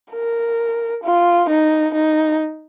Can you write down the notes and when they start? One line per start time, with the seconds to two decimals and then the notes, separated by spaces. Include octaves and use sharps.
0.12 A#4
1.03 F4
1.49 D#4
1.95 D#4